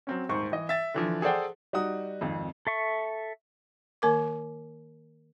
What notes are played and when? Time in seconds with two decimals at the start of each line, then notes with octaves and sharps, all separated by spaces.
0.07 F#3 C4 C#4
0.29 D#1 G#2 C5 C#6
0.52 E3 D#5
0.69 E5 A6
0.94 D3 E3 F3
1.22 G#4 A4 C5 D5 F#5 G5
1.73 G3 D#4 F#4 D#6
2.21 G#1 F2
2.67 A4 E5 C#6
4.02 D#3 A#3 A#4 D6